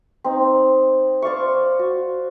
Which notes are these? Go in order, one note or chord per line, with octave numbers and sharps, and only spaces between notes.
C4 D#4
C5 D5 F5 C#6
F#4